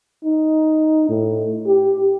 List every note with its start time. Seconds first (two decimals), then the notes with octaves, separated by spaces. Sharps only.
0.25 D#4
1.09 A2
1.67 G4